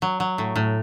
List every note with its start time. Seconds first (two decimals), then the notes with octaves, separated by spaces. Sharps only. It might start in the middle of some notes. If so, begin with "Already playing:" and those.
0.02 F#3
0.20 F#3
0.38 A2
0.56 A2